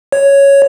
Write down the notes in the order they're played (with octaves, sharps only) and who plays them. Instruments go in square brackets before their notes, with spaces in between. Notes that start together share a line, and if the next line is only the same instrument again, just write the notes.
[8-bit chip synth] C#5